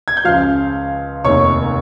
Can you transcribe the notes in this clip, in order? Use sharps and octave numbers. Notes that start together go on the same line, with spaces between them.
G#6
G6
C#2 C#3 F3 F5 F6
F1 D#2 D#3 C#5 C#6